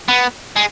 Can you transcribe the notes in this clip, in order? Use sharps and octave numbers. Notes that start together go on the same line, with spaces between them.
B3
G#3